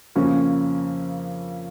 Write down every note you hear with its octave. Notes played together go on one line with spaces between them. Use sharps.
F2 C#3 A#3 C#4